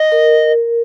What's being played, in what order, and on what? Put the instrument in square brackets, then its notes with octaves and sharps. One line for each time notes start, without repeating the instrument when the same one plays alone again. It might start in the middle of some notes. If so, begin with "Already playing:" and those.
Already playing: [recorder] D#5
[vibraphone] A#4